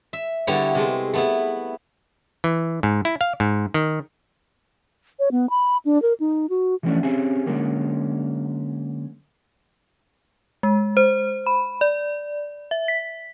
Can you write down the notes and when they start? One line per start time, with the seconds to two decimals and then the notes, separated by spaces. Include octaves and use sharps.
0.13 E5
0.47 D3 G3 B3 E4 A4 C#5
0.75 C3 G#3 A3
1.13 A3 B3 E4
2.44 E3
2.83 G#2
3.05 E4
3.21 F5
3.40 G#2
3.74 D#3
5.19 C#5
5.32 B3
5.50 B5
5.85 D4
6.02 A#4
6.20 D#4
6.50 F#4
6.83 E3 F3 A3 A#3 C#4 D4
7.03 C4 C#4 G4 G#4
7.46 D3 F#3 G#3 A#3 C#4
10.63 G#3
10.97 C5
11.47 B5
11.81 D5
12.71 E5
12.88 B6